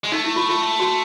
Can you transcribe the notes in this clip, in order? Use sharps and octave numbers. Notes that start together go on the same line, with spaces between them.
G#3
A3 D#4
E4
F4
F4
F4
F#4